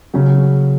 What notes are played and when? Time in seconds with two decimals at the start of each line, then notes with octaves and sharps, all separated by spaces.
0.14 C#3 F#3 C#4